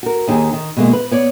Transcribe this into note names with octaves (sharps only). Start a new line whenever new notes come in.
F#4 A#4
D#2 D#3 G4 G#4
D#3
B2 E3 G#3 A#3
B4
B3 C#5 D5